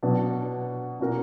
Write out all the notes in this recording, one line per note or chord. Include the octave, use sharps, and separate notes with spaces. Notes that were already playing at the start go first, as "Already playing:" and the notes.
B2 F#3 B3 D4
B2 A#3 C#4 F#4 A#4